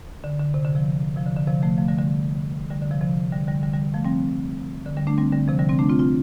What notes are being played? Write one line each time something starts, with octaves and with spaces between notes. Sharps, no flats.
D3
D3
C3
D3
C3 F3
C3 F3
D3
D3
C3 F3
F3 A3
F3 A3
D3 G3
D3 G3
D3 G3
D3
C3 F3
C3 F3
D3 G3
D3 G3
D3 G3
D3 G3
F3 A3
G3 C4
D3
D3 G3
A3 D4
G3 C4
D3 G3
C3 F3
D3 G3
G3 C4
A3 D4
C4 F4
C4 F4